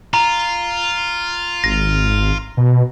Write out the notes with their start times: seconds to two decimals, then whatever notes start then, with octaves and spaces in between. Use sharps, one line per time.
0.14 F4 A#5
1.64 G#1 A#6
2.57 B2